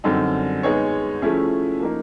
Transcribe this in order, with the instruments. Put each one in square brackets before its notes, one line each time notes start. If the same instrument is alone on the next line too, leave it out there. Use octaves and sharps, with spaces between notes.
[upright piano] F#2 D3 G3 C4 D#4
G#3 B3 D#4 G#4 C#5
F3 A3 C#4 E4 G#4
F3 A#3 D#4